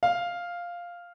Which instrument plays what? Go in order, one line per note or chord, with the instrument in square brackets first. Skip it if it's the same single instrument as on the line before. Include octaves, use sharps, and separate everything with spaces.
[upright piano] F5